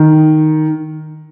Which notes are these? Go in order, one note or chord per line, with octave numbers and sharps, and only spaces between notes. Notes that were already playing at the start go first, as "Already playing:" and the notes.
Already playing: D#3